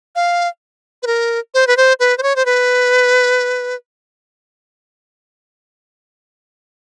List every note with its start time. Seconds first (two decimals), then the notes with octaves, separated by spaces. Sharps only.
0.16 F5
1.03 B4
1.07 A#4
1.54 C5
1.67 B4
1.77 C5
2.00 B4
2.18 C5
2.23 C#5
2.36 C5
2.46 B4